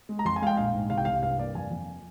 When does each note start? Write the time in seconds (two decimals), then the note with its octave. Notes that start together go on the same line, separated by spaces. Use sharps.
0.09 G#3
0.19 A#5
0.25 F2 C6
0.36 G#5
0.42 G#3 F5
0.47 G5
0.57 A#1 F5
0.74 G#2
0.90 C2 F5
0.98 G5
1.05 C2 F5
1.23 G2 F5
1.39 A#3 D5
1.55 F2 G#5
1.71 F2